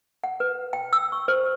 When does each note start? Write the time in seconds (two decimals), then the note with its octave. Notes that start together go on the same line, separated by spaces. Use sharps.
0.24 F#5
0.40 B4
0.73 G5
0.93 E6
1.12 C#6
1.28 C5